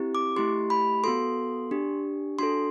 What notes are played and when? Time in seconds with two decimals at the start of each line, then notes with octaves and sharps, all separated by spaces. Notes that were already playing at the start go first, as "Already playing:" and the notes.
Already playing: C4 E4 G4
0.15 D6
0.36 A3 E4 G4 C6
0.70 B5
1.04 B3 F#4 A4 C6
1.71 D4 G4
2.39 D4 F#4 A4 C6